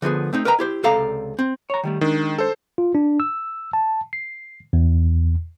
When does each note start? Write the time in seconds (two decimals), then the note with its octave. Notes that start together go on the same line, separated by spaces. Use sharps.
0.02 D3 F3 B3 G#4
0.33 A3 C4 D#4
0.45 A#4 B4 D#5 G5 A#5
0.59 E4 G4 C5
0.83 C#2 C3 A4 D5 F5 A#5
1.39 C4
1.70 C#5 A#5
1.84 D#3 G3 A3
2.01 D#3 G#3 D4
2.38 A4 C5
2.78 F4
2.95 D4
3.20 E6
3.73 A5
4.13 C7
4.73 E2